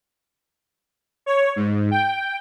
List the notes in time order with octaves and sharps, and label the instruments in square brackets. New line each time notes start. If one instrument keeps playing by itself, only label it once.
[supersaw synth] C#5
G#2
G5